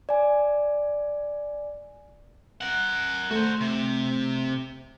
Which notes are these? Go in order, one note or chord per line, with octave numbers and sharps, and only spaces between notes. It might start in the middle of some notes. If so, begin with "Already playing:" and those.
D5 G#5
A#4 F#5
A3 F#4 C5
C3